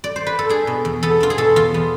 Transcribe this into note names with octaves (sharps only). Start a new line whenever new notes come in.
D5
C5
B4
A4
D4 G#4
B2
E2
B3 A4
D4 F4
G#4
B2 A4
E2 F4
B3